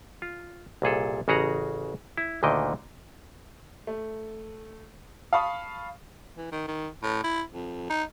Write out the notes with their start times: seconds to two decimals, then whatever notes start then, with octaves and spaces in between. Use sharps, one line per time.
0.22 F4
0.82 C2 A#2 G#4 A4
1.28 A1 C#3 F#4 G#4 F#5 A#5
2.18 E4
2.43 D2 A#2 D3 D#3 D#5 G5
3.87 A3
5.33 F5 A5 B5 C#6 D#6
6.36 E3
6.52 D#3
6.68 D#3
7.03 A2
7.24 E4
7.52 F2
7.89 D#4